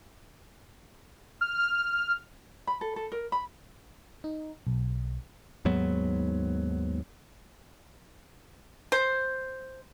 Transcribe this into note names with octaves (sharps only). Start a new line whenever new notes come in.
F6
B5
A4
A4
A#4
B5
D#4
B1
D#2 G#2 F#3 B3
C5